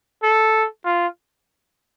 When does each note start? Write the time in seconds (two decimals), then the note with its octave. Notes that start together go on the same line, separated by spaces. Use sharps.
0.23 A4
0.85 F4